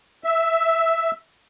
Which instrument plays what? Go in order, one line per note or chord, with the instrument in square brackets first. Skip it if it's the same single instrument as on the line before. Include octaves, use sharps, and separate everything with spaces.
[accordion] E5